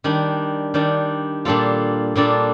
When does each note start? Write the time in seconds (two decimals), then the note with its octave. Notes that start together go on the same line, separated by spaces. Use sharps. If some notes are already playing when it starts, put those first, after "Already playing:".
0.04 D#3 G3 D4
0.74 D#3 G3 D4
1.45 A#2 G3 D4 F4 A4
2.15 A#2 G3 D4 F4 A4